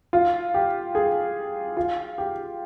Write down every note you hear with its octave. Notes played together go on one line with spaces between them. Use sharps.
F4
G4
G#4
F4
G4